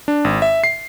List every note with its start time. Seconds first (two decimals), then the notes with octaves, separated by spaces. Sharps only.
0.08 D4
0.24 G#1
0.42 E5
0.64 C7